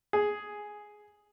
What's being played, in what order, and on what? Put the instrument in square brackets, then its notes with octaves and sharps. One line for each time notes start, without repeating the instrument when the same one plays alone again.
[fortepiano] G#4